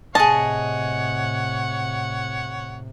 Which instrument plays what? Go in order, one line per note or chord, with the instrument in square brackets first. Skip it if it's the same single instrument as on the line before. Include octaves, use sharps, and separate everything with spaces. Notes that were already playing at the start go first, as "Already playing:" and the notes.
[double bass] A2 C3 [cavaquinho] G#4 D#5 [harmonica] C#5 F#5 [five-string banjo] A5